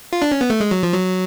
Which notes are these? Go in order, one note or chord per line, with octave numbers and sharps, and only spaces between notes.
F4
D4
C#4
B3
A3
G#3
F#3
F3
F#3